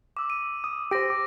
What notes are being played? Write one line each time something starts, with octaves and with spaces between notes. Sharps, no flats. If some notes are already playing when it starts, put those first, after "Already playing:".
D6 E6
D#7
D#6
G4 C5 A#6 D7
D6